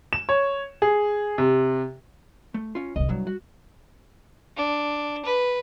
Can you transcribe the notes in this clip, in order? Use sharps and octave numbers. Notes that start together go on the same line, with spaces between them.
E7
C#5
G#4
C3
A3
C#4 F4
C2 D3 D#5
C2 G2 F#3 G3
F#4
D4
B4